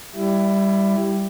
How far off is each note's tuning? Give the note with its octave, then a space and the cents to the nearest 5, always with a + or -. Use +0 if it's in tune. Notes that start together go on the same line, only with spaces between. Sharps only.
G3 +0 E4 +15